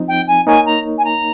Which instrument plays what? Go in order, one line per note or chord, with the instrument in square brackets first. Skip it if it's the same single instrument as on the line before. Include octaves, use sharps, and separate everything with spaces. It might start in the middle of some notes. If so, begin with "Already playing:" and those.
Already playing: [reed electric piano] F3 C4 D#4
[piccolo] G5
G#5
[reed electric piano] A#3 D#4 A#4 C#5 [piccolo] G#5
[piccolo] A#5
G#5
A#5